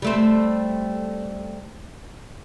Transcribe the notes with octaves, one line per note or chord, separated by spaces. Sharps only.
G3 A3 C4